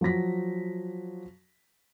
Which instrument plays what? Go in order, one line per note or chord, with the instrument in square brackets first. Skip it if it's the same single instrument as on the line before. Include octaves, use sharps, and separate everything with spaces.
[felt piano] F3 F#3 F#4 A#6 B6